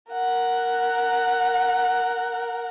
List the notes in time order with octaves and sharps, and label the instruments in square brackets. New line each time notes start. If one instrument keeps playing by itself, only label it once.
[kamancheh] A#4 F#5